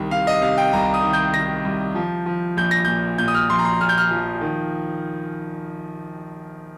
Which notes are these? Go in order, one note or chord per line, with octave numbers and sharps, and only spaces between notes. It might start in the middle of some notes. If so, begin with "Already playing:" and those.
Already playing: C2 D#3
C3 F5
D#5
C3 F5
G5
C2 A#5
D#6
D#3
G6
D#3 A#6
C2
F3
F3
A#1 G6
A#6
A#2 G6
A#2 G6
D#6
F6
A#1 C6
A#5
C6
A#1 F6
G6
F6
F3
D#3